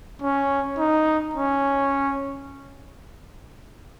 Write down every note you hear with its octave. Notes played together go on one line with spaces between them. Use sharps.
C#4
D#4
C#4